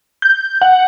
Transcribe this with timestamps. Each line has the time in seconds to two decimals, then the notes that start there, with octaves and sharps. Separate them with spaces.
0.22 G6
0.62 F#5